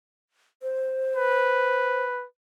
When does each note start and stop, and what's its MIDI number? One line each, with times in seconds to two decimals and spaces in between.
0.63 2.03 72
1.16 2.26 71